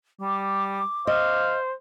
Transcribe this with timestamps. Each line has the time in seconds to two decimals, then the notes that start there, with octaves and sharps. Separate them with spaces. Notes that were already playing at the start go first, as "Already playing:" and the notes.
0.21 G3 D6
1.07 C5 D#5 F5